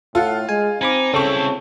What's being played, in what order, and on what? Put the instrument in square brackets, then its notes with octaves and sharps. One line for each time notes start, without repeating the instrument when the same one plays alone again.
[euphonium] A2 [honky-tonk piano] F4 F5 [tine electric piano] A4 F#5
[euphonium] G#3 [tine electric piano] G#5
[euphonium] C4 [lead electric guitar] D#4 [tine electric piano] G#5 B5 D6
[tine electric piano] C#3 [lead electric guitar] C4 E4 [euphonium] C#4 [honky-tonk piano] A4 C#6